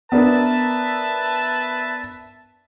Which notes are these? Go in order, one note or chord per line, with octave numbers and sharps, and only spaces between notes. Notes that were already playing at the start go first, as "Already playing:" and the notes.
B3 D4 A#4 B4 E5 A5